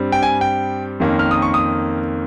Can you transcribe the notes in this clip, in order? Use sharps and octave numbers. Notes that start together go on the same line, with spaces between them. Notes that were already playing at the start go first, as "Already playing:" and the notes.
Already playing: G2 G3 C4
G5
G#5
G5
F2 D#3 A#3 C#4
F6
D#6
C#6
D#6